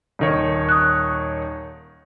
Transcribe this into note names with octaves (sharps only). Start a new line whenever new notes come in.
D#1 D#3 C#5
D#6 F#6